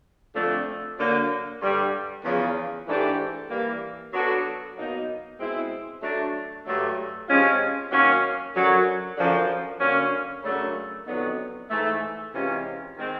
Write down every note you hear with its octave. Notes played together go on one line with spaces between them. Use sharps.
F2 D3 F3 A3 D4
D3 F#3 A#3
G2 D3 G3
E2 C#3 F3
G#2 E3 A3 D4 G4
E3 G3 A#3
F#3 B3 D4 F#4 A4
B2 F#3 A#3 D#4
B2 G#3 C4 E4
F#3 A3 D4
G2 D3 F#3 A3
C3 F3 G#3 C#4 F4
D#3 F#3 A#3 C#4
F#2 D3 F#3
F#2 D3 F3
D3 F#3 A#3 C#4
F#2 C#3 F#3 A3 D4
F2 D3 F#3 B3 D#4
G#2 E3 A3
C3 E3 G#3 C#4 F4
D#3 G#3 C4